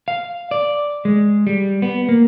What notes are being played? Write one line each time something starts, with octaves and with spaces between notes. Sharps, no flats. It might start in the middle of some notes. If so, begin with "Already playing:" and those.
F5
D5
G#3
G3
B3
A#3